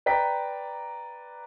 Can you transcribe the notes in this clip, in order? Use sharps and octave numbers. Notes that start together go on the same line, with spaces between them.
B4 D5 G5 A#5 B6